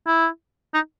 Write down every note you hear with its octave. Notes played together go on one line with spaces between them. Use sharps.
E4
D#4